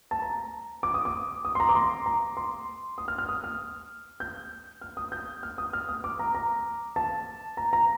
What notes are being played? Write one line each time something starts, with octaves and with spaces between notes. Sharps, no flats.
A5
A#5
D6
D#6
D6
D#6
C6
A#5
D6
C6
A#5
C6
D#6
F6
F6
D#6
F6
G6
F6
D#6
G6
F6
D#6
F6
D#6
D6
A#5
A#5
A5
A#5
A#5